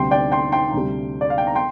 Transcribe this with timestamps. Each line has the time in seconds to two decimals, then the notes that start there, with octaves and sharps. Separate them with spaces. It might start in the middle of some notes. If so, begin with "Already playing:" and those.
Already playing: D2 C3 G3 G5 C6
0.11 D5 G5
0.32 G5 C6
0.52 G5 C6
0.74 D2 C3 G3
1.21 D5
1.30 F5
1.38 G5
1.47 A#5
1.55 G5 C6